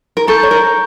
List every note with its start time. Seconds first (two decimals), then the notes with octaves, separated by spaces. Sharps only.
0.17 A#4
0.27 A4 A#5 C#6 G6
0.43 C#5
0.51 A#4